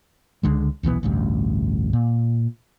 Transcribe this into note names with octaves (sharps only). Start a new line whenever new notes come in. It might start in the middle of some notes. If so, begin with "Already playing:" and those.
C#2 D3 G#3
D#1 B1 E3 B3
A1 D2 G2
A#2